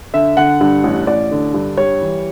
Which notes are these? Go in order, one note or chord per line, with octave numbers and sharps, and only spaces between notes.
D3 E5
D3 F#5
G2
A1
A1 D5
D3
G2
G3 C#5
E3